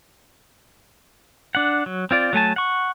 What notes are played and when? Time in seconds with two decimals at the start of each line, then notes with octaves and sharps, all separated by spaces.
1.55 D4 F#5
1.86 F#3
2.11 C4 F4 D5
2.33 F#3 A3 G#5 A5
2.56 F#5 C#6